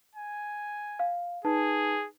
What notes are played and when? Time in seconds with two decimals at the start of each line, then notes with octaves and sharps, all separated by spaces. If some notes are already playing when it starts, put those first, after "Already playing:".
0.15 G#5
0.99 F5
1.45 D#4 G#4 B4 A5